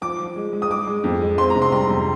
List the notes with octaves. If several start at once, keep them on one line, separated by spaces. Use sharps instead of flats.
F3 D6
F3
G#3
G#3
D#6
G#3 D6
G#3
F2
G#3
C4 C6
A#5
C3
C6
G3 C6
F2